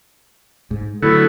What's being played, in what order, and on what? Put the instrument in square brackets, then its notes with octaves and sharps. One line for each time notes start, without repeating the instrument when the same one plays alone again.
[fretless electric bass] G#2
[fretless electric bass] D3 [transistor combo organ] F#3 A3 B3 [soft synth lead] E4 [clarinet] A4